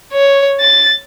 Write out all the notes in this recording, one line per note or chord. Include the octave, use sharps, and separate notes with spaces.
C#5
A6